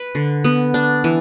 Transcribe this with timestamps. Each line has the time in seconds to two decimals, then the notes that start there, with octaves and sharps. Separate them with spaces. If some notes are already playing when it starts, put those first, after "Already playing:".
Already playing: B4
0.15 D3
0.44 B3
0.74 D4
1.04 E3